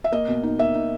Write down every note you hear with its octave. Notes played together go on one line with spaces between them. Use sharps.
E5
A#3 D#5
B2
D#4
A#3 E5
D#4